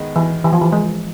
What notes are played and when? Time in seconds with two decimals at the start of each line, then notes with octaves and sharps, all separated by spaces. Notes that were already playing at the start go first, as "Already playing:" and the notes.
Already playing: D#3 G#3 B3
0.16 E3
0.44 E3
0.53 F3
0.62 E3
0.72 G#3